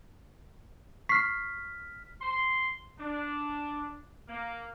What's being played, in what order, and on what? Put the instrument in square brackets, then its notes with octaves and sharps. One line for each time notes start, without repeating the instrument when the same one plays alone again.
[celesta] C#6 C7 [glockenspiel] F6 B6
[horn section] C6
D4
A#3